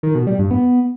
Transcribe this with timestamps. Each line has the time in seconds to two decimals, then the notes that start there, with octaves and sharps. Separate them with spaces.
0.03 D#3
0.15 B2
0.27 G3
0.39 G2
0.51 B3